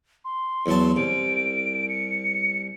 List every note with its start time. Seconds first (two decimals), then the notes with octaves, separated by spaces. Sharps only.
0.25 C6
0.66 E2 F#3 A5
0.96 C2 D7
1.89 C#7